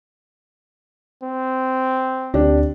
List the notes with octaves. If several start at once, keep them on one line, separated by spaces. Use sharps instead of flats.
C4
D2 C4 D4 G4